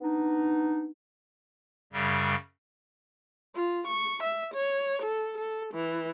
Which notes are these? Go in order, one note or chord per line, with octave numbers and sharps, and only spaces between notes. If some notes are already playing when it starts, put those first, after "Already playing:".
B3 D4 D#4
F#2 C#3 G3
F4
C#6
E5
C#5
A4
A4
E3